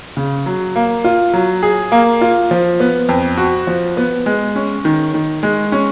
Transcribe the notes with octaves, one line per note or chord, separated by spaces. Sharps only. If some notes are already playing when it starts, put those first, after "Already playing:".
C#3
F#3
A#3
F4
F#3
G#4
A#3
F4
F3
B3
F2
F#4
F3
B3
G#3
C#4
D#3
D#3
G#3
C#4